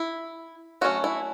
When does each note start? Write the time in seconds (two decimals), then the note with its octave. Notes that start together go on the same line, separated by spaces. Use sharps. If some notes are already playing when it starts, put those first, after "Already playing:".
Already playing: E4
0.81 F#3 A3 C#4 F#4
1.04 E4